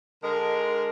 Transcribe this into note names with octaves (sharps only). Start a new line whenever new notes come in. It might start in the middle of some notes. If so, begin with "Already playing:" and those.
D3 G#3 A#4